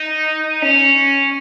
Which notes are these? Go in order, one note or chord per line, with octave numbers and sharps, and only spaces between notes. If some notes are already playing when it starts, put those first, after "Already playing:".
Already playing: D#4
C#4